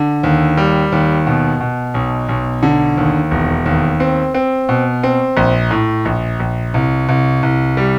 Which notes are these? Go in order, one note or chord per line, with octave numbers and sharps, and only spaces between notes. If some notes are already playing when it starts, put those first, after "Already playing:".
Already playing: D3
D#2
G3
D#2
B2
B2
B1
B1
D3
D#2
E1
D#2
C4
C4
B2
C4
A#1
A2
A#1
A#1
C2
C2
C2
G3